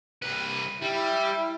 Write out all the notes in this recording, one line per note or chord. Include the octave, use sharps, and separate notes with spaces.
C2 B4
G3 E4